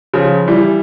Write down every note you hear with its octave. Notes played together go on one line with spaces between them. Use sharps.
C#3 F3
E3 G3